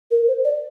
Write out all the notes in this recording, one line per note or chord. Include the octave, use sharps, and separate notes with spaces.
A#4
C5
D5